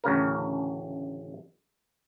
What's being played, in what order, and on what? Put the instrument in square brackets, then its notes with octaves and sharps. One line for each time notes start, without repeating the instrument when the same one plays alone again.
[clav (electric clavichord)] A1 D2 C#3 A#4